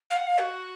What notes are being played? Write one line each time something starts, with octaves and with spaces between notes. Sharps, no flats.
F5
F#5
F5
F#4